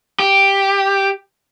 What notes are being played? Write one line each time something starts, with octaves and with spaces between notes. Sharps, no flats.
G4